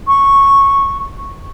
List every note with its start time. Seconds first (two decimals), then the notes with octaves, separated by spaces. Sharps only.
0.07 C#6